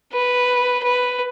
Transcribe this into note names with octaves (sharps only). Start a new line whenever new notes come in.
B4
B4